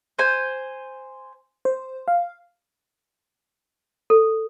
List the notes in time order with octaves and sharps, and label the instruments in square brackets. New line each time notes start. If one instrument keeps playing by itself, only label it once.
[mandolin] C5 G#5
[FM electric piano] C5
F5
[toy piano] A4